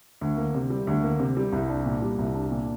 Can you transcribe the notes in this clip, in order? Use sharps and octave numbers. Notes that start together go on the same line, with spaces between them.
D2
A#3
C3
G3
D2
A#3
C3
G3
C2
D4
A#2
G3
C2
D4
A#2